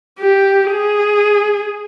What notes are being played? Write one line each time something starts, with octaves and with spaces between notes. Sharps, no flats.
G4
G#4